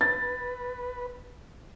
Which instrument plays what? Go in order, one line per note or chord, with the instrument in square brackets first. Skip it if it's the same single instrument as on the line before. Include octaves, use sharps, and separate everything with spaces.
[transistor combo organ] B4 [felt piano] A6